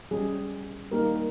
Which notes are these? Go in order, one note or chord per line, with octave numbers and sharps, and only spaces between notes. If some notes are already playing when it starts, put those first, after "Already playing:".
G3 C#4 G4 G#4
G3 A#3 D#4 G4 A#4